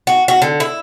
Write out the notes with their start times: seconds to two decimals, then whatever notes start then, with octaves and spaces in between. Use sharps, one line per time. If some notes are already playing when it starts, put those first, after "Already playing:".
0.07 F#4
0.28 F#4
0.42 D3
0.60 E4